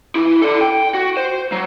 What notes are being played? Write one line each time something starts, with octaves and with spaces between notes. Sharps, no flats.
E3 E4
A4 D5
G5
F#4
C5
F#3